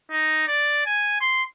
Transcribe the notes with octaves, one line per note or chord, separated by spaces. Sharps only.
D#4
D5
G#5
C6